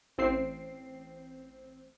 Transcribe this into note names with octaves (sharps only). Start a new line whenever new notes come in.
A1 C4 C7